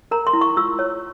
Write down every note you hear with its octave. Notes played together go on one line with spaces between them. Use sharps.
A#4 A#5
C6
E4
C#6
F4 E6
C#5